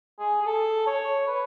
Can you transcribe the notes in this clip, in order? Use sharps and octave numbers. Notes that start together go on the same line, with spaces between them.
G#4
G#4
A4
C#5
B4